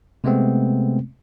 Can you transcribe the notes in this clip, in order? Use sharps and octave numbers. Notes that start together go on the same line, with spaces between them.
C3 G#3 A3 B3 C4